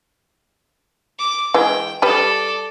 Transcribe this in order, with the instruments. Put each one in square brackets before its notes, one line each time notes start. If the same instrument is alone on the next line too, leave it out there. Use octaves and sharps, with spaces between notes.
[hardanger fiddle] D6
[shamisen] E3 G#3 [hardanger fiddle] G5
[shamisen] G3 B4 [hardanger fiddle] A4 D5